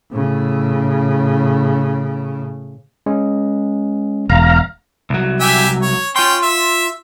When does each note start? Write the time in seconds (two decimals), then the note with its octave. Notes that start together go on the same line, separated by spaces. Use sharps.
0.11 A2 C#3
3.06 G#3 C#4
4.30 E1 F5 A#5
5.10 C2 F#3
5.41 G4 E5 G#5
5.82 C#5
6.16 C#4 F4 G5 C6
6.43 E5